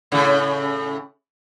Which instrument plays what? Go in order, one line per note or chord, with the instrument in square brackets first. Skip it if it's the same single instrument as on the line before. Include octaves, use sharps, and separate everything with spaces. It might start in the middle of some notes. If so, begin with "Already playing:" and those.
[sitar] A2 C#3